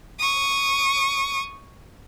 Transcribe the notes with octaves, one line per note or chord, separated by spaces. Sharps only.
C#6 D#6